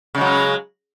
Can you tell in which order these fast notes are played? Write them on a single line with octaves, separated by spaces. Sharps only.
C#3 G#3 F#3